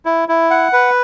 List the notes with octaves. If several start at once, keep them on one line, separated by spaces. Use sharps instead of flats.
E4
E4
F#5
B4